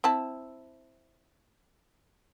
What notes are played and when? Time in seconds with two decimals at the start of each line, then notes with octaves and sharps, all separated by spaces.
0.04 C4 E4 A5